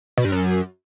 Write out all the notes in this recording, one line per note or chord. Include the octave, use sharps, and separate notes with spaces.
B2
G2
F#2